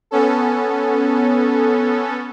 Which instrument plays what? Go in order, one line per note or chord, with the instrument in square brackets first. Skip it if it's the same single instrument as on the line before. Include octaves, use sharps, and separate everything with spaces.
[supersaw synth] B3 C#4 A4